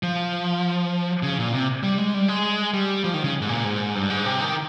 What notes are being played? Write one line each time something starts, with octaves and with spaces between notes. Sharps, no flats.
F3
C#3
A#2
C3
G3
G#3
G3
G#3
G3
F3
D#3
C#3
G#2
A#2
G#2
G2
G#2
C3
D#3